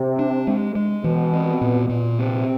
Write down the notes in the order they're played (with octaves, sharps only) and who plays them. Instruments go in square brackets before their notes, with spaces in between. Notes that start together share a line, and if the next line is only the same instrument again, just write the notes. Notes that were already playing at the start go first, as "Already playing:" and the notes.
Already playing: [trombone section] C3
[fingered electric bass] D4
G#3
G#3
[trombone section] B2 [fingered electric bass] E3
[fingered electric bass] C4
A#2
A#2
[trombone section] C3 [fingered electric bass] C4